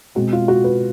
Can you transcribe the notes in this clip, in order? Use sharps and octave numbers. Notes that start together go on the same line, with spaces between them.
B2 G#3 C4 F#4
F4
F#4
B4